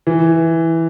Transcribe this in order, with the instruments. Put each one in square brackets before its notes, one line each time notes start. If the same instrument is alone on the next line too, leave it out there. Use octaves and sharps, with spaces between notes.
[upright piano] E3